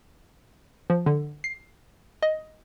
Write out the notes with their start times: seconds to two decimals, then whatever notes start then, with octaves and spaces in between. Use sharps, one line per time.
0.90 F3
1.06 D3
1.44 C7
2.23 D#5